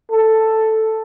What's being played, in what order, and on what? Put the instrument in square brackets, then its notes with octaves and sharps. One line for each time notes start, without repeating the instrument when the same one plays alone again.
[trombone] A4